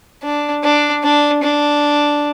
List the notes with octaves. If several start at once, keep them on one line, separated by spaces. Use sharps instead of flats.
D4
D4
D4
D4